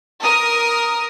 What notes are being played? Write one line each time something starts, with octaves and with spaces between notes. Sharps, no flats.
A#4 D#6